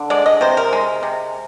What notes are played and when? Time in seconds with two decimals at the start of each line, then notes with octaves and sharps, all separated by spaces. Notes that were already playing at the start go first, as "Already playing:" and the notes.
Already playing: D3
0.10 G#3 D5
0.26 D#5
0.41 C3 C5
0.57 A#4
0.73 G#3
1.03 C3